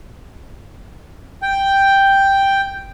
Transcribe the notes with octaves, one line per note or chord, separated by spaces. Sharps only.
G5